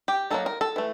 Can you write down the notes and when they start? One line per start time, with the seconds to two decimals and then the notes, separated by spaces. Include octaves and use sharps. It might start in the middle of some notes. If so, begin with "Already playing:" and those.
0.08 G4
0.30 F#3 A#3 D#4 A4
0.46 A#4
0.61 A4
0.76 E3 A3